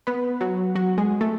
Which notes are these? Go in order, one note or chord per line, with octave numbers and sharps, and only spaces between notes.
B3 B4
F#3 F#4
F#3 F#4
G#3 G#4
A3 A4